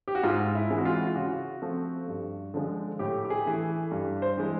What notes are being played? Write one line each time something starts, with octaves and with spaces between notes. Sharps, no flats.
G4
F#4
G#2 F4
E4
E3 G#3 C4
F#4
F4
F4
C#3 F#4
F3 A3 C4
G2
D3 F3 G#3
A2 G4
G4
G#4
E3 A3
G2
C5
E3 G#3